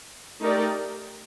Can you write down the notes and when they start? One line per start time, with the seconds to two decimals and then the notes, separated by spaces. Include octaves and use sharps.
0.40 A3 D#4 G4 A#4 D5